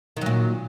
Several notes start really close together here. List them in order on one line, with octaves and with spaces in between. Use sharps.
D#3 F#3 A#2